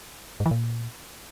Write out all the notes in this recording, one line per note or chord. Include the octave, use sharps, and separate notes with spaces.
G#2
E3
A#2